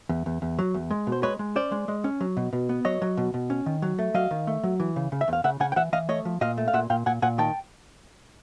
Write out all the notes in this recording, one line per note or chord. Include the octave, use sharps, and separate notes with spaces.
E2
E2
E2
F#3
E2
G#3
B2
C5
G#3 B4 C#5
G#3
C#4 C5 D5
G#3
G#3
C#4
F#3
B2
B2
B3
F#3 C#5 D#5
F#3
B2
B2
C#4
D#3
F#3
A3
F#3 D#5 F5
D#3
A3
F#3
E3
C#3
C#3
E5
E2
F5
C#3 E5 F#5
C#3 F#5 G#5
G5
E3 E5 F#5
E3 D#5 F5
A3 C#5 D#5
F3
A#2 D#5 F5
A3
F5
A#2 E5 F#5
A#2 F5 G5
A#2 F#5 G#5
A#2 F#5 G#5
D#3 G5 A5